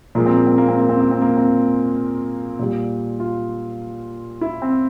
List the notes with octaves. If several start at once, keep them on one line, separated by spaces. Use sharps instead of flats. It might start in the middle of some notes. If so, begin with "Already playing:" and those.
A#2 F3 G#3 A#3
C4
A#3
C4
A#3
C4
A#3
C4
A#3
C4
A#3
C4
A#2 G3
F4
E4
C4